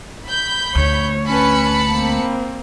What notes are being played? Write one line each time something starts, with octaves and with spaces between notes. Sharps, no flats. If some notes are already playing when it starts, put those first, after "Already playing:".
B5 G6
D2 C#5
C#4 B4 A5 B5 C#7
A#3 C4